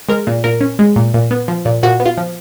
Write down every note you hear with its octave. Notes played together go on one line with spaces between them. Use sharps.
G#3 A#4
A#2
A#2 A#4
C#4
G#3
A#2
A#2
B3
F3
A#2
A#2 F#4
B3
F4
F3